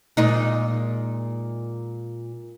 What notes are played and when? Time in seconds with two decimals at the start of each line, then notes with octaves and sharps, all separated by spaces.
0.17 A#2 G#3 D#4